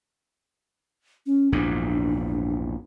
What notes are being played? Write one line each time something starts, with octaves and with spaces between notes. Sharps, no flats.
C#4
A#1 E2 G#2 D4